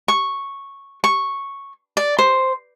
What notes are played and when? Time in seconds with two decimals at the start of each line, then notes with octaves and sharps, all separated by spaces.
0.08 C#6
1.04 C#6
1.97 D5
2.19 C5